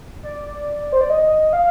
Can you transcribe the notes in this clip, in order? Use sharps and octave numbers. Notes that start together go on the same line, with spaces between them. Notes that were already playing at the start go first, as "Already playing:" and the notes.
D5
C5
D5
D#5
F5